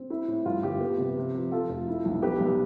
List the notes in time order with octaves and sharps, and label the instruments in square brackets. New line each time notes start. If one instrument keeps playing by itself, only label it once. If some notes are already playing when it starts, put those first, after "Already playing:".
Already playing: [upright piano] C4
E4
A2
G2 F4
G1 G4
B3
C3
C3
F3
F3 F4 A4
F1
E4
B1
B3 G4 B4
B1